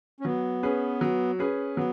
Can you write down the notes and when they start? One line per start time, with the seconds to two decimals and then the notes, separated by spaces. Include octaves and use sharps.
0.20 C#4
0.25 F#3 B3
0.63 C#4 G#4 B4
1.01 F#3
1.39 C#4 G#4 B4
1.77 F#3 B3